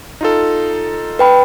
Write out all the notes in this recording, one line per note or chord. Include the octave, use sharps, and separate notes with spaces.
D#4 F4 A4
B4 G5 B5